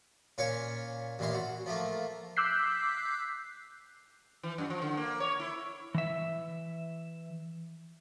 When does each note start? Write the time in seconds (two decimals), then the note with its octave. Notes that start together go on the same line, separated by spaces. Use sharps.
0.38 A#2 C#4 C#5 F5 C#6
1.19 A1 A#2 E3 F5 C6
1.34 F#4
1.66 F3 A3 A#3
2.37 D6 E6 F#6 G6 B6 C7
4.43 E3
4.58 F#2
4.70 F3
4.82 D3
4.97 A#3
5.20 C#5
5.40 E4
5.95 E3 E5